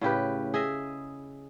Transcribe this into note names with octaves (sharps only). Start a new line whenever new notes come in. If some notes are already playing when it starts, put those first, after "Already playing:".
A2 C#3 G4 B4
G#4 D#5 E5